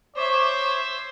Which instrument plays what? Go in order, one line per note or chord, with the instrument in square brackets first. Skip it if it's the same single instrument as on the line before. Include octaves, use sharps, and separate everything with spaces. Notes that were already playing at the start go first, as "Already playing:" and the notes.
[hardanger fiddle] C5 E5 [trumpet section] C#5 D6